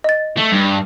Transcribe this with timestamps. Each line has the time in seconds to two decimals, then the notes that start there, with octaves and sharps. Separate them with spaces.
0.04 D#5 A6
0.37 A3
0.52 G2